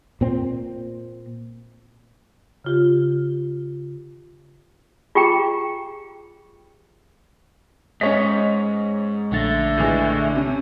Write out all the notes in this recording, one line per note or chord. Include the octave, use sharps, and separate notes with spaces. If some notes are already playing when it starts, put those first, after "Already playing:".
A#2 C4
C#3 F4 G4
F4 G4 G#4 G5 A#5
G#2 C#4 C#5 D#5 B6
A#1 D3 A3 A6 A#6
A2 E3 G#3
C3 C#4